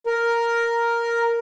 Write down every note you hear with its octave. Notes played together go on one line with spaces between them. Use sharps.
A#4